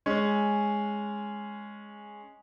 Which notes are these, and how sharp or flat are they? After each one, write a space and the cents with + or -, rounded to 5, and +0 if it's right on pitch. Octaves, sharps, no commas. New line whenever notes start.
G#3 +0 C#4 +0